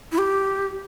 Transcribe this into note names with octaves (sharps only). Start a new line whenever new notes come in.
E4
G4